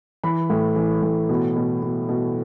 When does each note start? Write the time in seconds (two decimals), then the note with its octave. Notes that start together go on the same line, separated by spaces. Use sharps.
0.24 E3 B5
0.50 A2
0.76 E3
1.02 A2
1.29 B2
1.56 B2
1.83 B2
2.09 B2